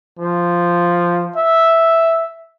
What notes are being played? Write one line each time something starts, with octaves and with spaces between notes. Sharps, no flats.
F3
E5